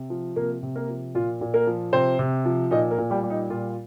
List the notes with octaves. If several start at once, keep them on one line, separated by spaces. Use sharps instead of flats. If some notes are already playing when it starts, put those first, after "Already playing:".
Already playing: C3
F3
C3 A#3 A#4
C3
A#3 A#4
F3
A#2 F4
A#2
A#3 A#4
F3
C3 C4 C5
C3
F3
A#2 D#4 D#5
A#3 A#4
A#2
G3 G4
G3
D#4
A#2 F4